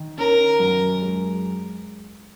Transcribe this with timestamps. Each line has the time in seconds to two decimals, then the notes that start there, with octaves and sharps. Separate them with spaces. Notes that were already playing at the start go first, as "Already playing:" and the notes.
Already playing: D#3
0.18 C#4 A#4
0.60 F#2
1.02 G#3